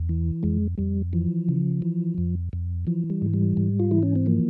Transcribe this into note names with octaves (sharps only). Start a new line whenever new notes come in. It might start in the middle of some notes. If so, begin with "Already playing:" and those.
Already playing: E2
E3
F2 G#3
F2 G3
E3 F3
C#3
E3
F2
F2
E3 F3
G3
G#2
G3
G#2
F4
E3 E4
C#4
C4
F3 A#3